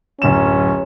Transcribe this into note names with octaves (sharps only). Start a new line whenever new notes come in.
D1 F#2 C#4 E7